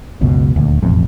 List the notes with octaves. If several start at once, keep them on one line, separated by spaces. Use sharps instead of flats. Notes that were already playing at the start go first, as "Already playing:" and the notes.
F#1 C#2 B2
D#1 D2
E1 A1 F2